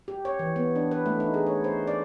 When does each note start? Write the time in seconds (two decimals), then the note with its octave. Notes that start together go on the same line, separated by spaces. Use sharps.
0.08 G4
0.25 C#5
0.39 E3
0.56 B3
0.76 D4
0.91 B4
1.06 A3
1.20 D#4
1.34 G#4
1.46 C#5
1.64 C5
1.87 D5